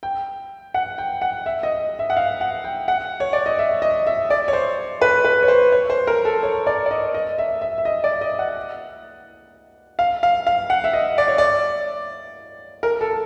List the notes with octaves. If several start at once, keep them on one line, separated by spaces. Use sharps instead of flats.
G5
F#5
G5
F#5
E5
D#5
E5
F#5
F5
F#5
G5
F#5
C#5
D5
D#5
E5
D#5
E5
D5
C#5
C5
B4
B4
C#5
C5
C#5
C5
A#4
A4
C#5
D5
D5
D#5
D#5
E5
E5
E5
D#5
D5
D#5
F#5
F5
F5
F5
F#5
E5
D#5
D5
C#5
D5
A#4
A4